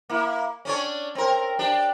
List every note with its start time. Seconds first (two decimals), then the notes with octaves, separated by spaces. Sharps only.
0.09 A#3 E4
0.65 C#4 D4 C#5
1.15 C4 A#4
1.59 D4 G4